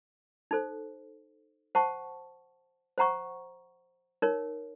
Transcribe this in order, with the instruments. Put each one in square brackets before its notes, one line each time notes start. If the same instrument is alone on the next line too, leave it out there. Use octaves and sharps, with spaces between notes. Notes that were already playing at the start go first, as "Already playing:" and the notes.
[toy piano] D#4 A4 C5
C5 F#5 A5 C#6
C5 F#5 A#5 C#6
D#4 A#4 C#5